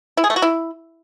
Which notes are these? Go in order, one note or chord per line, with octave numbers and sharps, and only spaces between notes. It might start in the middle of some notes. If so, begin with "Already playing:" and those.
E4
G#4
A3
F#4
E4